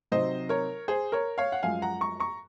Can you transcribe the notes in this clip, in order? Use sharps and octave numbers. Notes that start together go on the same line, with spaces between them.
C3 F#3 C4 D#4 C5 D#5
A#4 C#5
G#4 C5
A#4 C#5
C#5 F5
F#5
F#2 F3 G#3 F5 G#5
F#5 A#5
A#5 C#6
A#5 C#6